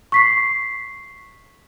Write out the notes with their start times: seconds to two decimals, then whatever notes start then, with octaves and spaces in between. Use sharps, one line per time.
0.12 C#6 B6 C7